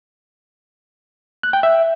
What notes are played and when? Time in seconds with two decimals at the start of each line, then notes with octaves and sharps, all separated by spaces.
1.43 F#6
1.53 G5
1.63 E5